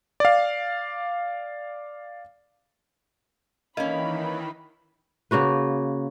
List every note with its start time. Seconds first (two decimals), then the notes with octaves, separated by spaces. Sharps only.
0.20 D5 F5
3.77 D#3 E3 A#3 C#4 D#5 B5
5.31 C#3 A#3 F#4 B4